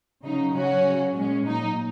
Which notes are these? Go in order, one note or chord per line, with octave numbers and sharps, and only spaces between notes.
C#3 F#3 D#4
C#3 F#3 C#4 F#4
C#3 F#3
A#2 G#3 C#4
A#2 F#3 D#4